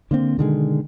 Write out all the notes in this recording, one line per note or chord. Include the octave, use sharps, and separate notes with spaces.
D3 A#3 C4
B2 D3 D#3 G#3